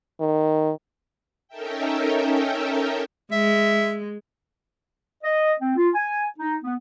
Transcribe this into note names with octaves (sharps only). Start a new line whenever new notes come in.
D#3
C#4 D#4 A4 A#4 E5 G5
G#3 E5
D#5
C4
F4
G#5
D#4
B3